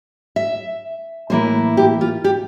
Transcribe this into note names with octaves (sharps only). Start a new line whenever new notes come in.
E5
A2 E3 A#3 E4 C5
G4
F4
G4